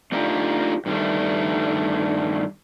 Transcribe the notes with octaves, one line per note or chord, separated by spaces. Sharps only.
A3 D4 D#4 F4 G4
G2 D#3 G3 A3